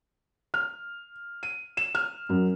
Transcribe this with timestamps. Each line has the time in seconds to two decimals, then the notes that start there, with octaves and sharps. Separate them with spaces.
0.54 F6
1.43 D#7
1.77 E7
1.95 F6
2.29 F#2